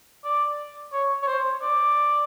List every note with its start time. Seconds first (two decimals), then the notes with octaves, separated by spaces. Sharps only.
0.25 D5
0.92 C#5
1.23 C#5
1.27 C5
1.62 D5